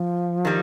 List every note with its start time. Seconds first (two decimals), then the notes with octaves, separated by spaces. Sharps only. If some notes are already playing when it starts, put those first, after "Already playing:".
Already playing: F3
0.45 D#3 G3